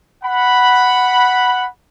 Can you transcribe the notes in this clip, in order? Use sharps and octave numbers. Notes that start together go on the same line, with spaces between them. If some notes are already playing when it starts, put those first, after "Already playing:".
F#5 B5